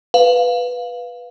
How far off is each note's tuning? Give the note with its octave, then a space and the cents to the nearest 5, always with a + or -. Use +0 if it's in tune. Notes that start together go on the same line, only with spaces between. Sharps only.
B4 +0 F5 +0